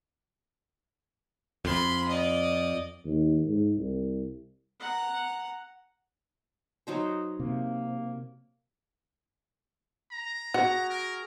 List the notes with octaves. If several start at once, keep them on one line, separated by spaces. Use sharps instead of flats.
F2 B5 C6
D5 D#5
D#2
G#2
C2
F#5 A#5
F#3 D#4 C5
C3 A#3
A#5
F#4 G#4 F#5
A#4